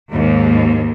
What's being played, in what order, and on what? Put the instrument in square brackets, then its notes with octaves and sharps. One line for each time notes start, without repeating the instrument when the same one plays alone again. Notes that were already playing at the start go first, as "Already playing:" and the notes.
[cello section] D#2 G#2